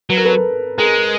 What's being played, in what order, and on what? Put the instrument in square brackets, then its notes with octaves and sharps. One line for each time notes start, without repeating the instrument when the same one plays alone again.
[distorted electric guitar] F#3 [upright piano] B4
[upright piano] A#4
A4 B4
[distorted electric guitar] G#3 [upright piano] G#4 A#4